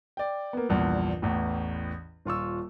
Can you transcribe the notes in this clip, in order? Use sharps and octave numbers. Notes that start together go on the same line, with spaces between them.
D5 G5
A#3 B3
A#1 E2 G2 A#2
A1 E2 A2
D#1 F4 C#6 E6